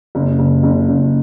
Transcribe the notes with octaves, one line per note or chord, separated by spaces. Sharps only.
F#1
F#1
F#1
F#1